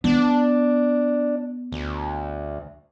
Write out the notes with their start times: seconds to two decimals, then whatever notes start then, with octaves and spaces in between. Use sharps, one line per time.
0.04 B3 D4
1.72 D2